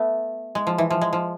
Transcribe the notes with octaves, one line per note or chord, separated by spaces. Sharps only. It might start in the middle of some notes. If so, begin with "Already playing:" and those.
Already playing: A3 B3
G#3
F3
E3
F3
G#3
F3